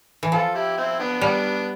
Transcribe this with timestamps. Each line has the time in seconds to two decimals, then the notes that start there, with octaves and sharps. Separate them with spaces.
0.23 E3
0.32 F3 F4 A4
0.54 E4 G4
0.77 C4 E4
0.99 B3 D4
1.21 G3 B3 D4